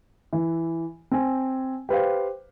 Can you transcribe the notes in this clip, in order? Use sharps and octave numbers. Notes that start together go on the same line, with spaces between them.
E3
C4 G#5
G4 B4 C5 F5